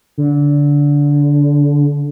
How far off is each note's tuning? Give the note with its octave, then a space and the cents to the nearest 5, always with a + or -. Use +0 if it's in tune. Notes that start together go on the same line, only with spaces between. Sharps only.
D3 -20